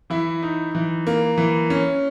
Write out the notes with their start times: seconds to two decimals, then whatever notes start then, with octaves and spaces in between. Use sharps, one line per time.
0.10 E3 E4 E5
0.42 D#4
0.75 E3
1.07 A#3
1.38 E3
1.70 C#4